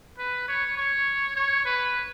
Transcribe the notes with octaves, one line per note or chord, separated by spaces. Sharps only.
B4
C#5
C#5
C#5
B4